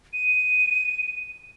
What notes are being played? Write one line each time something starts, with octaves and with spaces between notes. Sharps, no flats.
D#7